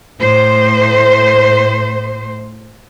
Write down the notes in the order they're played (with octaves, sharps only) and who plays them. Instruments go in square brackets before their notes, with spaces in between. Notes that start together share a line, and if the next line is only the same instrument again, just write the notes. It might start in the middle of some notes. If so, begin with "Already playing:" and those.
[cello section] A2 C5